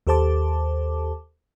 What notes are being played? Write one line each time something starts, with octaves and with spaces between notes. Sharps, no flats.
D#2 G4 A4 C5 A5 D6